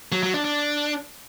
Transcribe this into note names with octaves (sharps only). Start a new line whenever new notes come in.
F#3
F#3
D4
D4